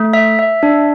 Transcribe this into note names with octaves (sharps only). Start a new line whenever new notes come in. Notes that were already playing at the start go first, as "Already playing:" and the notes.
Already playing: A3
E5
E5
D4